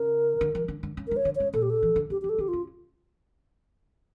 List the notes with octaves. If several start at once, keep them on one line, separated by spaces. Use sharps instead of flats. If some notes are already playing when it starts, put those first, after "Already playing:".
Already playing: C#3 A#4
D3
E3
D3
D3
C#3
D3 A#4
C#5
D3
C#3 C#5
A#2 A4
G4
A4
E3
D3
C#3 G4
E3 G4
A4
D3 G4
C#3 F4